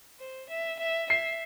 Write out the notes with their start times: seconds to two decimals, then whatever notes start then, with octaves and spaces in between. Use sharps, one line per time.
0.19 C5
0.49 E5
0.79 E5
1.10 E5 C7